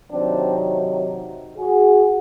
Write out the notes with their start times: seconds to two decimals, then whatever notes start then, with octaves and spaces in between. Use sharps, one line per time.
0.11 C3 D#3 F#3 C4 D4
1.58 F#4 G#4